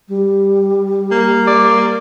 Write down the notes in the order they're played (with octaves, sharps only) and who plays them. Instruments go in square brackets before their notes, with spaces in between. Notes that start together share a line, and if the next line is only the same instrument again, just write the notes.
[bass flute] G3
[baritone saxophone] A#3
[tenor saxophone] D5